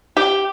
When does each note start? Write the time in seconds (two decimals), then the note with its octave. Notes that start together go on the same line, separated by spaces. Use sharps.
0.17 G4